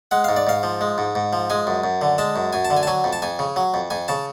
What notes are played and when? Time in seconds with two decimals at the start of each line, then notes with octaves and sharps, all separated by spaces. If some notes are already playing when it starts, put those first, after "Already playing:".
0.11 G#3 F#5
0.24 G#2 F5
0.36 D5
0.47 G#2 F5
0.63 F3
0.81 G#3
0.98 G#2
1.15 G#2
1.33 F3
1.50 G#3 G#5
1.67 F#2
1.84 F#2
2.01 D3
2.18 G#3 A5
2.36 F#2
2.53 F#2 G#5
2.65 A5
2.70 D3
2.77 G#5
2.83 A5
2.87 F#3 G#5
3.04 F2
3.13 A5
3.22 F2 G#5
3.39 C#3
3.56 F#3
3.74 F2
3.90 F2 G#5
4.08 C#3 A5